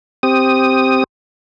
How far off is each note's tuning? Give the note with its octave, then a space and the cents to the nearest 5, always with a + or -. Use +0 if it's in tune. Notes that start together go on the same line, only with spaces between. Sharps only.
C4 +0 G4 +0 D#6 +0